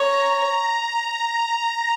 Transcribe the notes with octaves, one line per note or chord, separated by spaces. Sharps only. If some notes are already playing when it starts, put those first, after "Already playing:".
Already playing: C#5 A#5
A#5